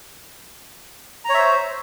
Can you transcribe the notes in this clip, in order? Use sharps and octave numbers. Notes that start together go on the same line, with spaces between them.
C5 C#5 E5 A#5